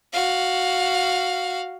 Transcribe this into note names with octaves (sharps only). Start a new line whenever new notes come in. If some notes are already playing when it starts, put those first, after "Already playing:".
F#4 F5